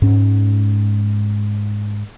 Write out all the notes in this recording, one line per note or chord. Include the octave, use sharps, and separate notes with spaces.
G#2 C#4